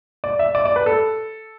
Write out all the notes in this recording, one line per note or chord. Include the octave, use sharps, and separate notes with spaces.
D5
E5
D5
D5
B4
A4